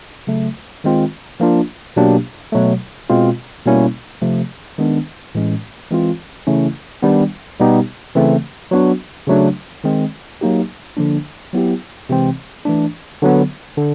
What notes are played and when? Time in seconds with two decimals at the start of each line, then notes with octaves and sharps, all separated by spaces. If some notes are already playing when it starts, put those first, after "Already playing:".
0.27 C#3 F#3 A3
0.84 D#3 G#3 C4 F4
1.40 F3 A#3 D4 F4
1.96 B2 F#3 A#3 D4 G4
2.52 B2 F#3 A3
3.10 B2 G#3 C4 F4
3.66 B2 G3 A#3 C#4 E4
4.22 C3 F3 A3
4.78 D#3 G#3 B3 D4
5.35 A2 E3 G#3 C#4
5.91 E3 G#3 C4 F4
6.47 C#3 E3 A3 C#4 E4
7.03 D#3 G3 B3 D4
7.60 B2 G3 B3 D#4 G4
8.15 C#3 E3 A3 C4
8.71 F#3 B3 D4 F#4
9.27 C#3 F#3 A3 D4
9.84 D#3 G#3 C4
10.41 F#3 A#3 D#4 G4
10.97 D3 F3 A#3 D4
11.53 F#3 B3 E4 G4
12.09 C3 E3 G#3 C4
12.65 E3 A3 D4
13.22 D3 F#3 B3
13.78 D3